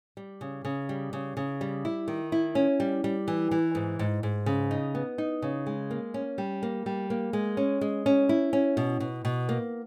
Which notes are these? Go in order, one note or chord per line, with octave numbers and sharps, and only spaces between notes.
G3
C#3
C#3
G3
C#3
C#3
G3
E4
D#3
E4
C#4
G3
G3
E3
E3
G#2
G#2
G#2
C#3
D#4
B3
D#4
C#3
G#3
A#3
C#4
G3
A#3
G3
A#3
G#3
C#4
G#3
C#4
E4
C#4
B2
B2
B2
A#3